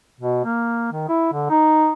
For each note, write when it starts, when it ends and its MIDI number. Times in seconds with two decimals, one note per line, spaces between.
0.20 0.40 47
0.44 0.89 58
0.92 1.06 51
1.09 1.32 64
1.33 1.49 50
1.50 1.93 63